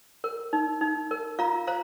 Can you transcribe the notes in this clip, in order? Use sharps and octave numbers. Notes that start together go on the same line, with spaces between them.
A#4
D#4
D#4
A#4
F4 F5 A#5
C5 F5 A#5